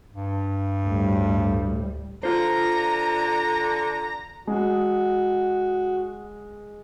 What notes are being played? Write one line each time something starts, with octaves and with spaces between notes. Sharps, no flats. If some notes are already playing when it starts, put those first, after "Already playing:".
G2
D2 A2 G3
D3 F4 C5 A#5
G#3 F#4